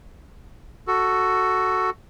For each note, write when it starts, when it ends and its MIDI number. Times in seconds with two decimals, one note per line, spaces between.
0.87 1.90 66
0.87 1.90 69